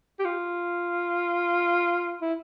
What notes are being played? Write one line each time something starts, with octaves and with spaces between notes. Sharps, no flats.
G4
F4
E4